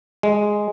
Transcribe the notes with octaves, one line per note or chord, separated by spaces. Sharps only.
G#3